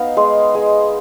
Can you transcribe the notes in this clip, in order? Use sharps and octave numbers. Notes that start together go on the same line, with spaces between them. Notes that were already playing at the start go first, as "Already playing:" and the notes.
Already playing: B3 D#4 D#5 F5
G#3 C6
G#3